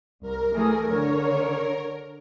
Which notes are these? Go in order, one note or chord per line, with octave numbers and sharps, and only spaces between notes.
C2 A#4
E3 A3 G#4
D3 C#5